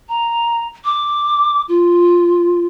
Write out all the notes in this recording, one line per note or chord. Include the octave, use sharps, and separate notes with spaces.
A#5
D6
F4